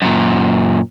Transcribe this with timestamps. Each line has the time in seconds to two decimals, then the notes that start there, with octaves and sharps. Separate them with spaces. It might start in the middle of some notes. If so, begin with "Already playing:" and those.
0.02 F#2 A#2